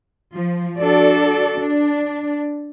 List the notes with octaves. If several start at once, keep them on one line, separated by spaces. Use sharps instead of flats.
F3
D4 F#4 A4 D5
D4